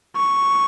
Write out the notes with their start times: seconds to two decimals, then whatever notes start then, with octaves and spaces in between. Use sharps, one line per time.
0.16 C#6